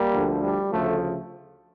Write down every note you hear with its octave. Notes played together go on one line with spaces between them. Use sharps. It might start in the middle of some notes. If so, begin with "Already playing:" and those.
Already playing: G3 A#3
D2 D3 F3
G3
D2 C#3 F3 A3